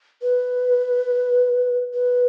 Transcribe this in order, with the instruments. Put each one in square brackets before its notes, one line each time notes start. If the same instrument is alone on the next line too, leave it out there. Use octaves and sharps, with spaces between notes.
[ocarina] B4
B4